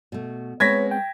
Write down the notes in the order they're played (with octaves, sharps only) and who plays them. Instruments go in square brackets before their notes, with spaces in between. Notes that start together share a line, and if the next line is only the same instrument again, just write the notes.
[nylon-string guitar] B2 A3
[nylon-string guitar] G#3 B3 C4 [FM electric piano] B4 C#5 [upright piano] G#6 A#6 B6
[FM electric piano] G5